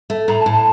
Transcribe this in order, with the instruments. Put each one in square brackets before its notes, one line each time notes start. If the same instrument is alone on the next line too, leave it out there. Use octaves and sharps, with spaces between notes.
[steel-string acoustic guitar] A3
[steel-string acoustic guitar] A2 [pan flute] A#5
[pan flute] A5
[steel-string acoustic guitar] A2
[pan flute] A5